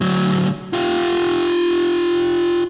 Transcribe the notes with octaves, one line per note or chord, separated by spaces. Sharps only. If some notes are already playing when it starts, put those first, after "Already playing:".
D2 F#3
F4 G4